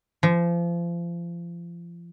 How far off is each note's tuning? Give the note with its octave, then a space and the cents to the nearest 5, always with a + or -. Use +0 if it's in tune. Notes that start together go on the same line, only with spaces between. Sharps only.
F3 -30